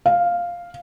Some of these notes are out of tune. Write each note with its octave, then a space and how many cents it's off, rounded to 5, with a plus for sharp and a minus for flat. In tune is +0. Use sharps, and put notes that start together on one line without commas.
F5 +0